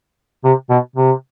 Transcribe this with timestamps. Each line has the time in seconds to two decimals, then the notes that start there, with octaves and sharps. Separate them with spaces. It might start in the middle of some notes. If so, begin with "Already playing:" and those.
0.44 C3
0.70 B2
0.96 C3